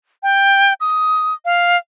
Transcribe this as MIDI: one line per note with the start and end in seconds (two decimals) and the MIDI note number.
0.23 0.74 79
0.81 1.34 87
1.45 1.77 77